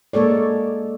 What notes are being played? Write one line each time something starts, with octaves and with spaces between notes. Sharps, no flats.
G#3 A#3 A4 C#5 D5